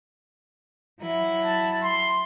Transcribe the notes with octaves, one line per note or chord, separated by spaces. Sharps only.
F#3 E4
A5
C6